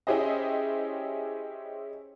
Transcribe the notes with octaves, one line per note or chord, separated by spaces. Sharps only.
C#4 E4 G4 G#4 C5 D#5